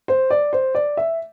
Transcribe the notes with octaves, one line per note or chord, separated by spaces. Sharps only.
C5
D5
C5
D5
E5